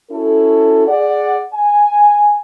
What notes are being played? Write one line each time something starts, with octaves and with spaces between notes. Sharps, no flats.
C#4 E4 F#4 A4
G#4 D5 F#5
G#5